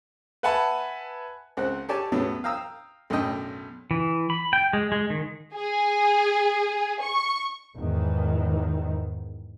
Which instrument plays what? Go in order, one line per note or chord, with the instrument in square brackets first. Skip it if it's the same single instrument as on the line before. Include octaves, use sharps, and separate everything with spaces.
[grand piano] B4 E5 F#5 G#5 A5 B5
[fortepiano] C#2 C4 F#5
G4 A4 C#5 D5 G#5 A5
E2 A2 F#3 B3 C#4
F5 G5 A#5 D#6 E6
B1 F#2 A2 D4 D#5 G5
[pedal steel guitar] E3
B5
G5
G#3
G#3
D#3
[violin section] G#4
C#6
[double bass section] E2 G#2 D#3